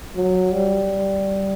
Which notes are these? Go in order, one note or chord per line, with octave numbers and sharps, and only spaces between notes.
F#3
G3